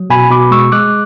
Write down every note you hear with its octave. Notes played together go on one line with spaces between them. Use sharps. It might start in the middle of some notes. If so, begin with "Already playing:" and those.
Already playing: F#3
B2 G#5 B5
B2 B5 D6
G#3 C#6 E6
G#3 D6 F#6